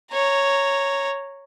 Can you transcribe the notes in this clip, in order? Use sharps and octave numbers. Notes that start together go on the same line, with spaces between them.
C#5 A#5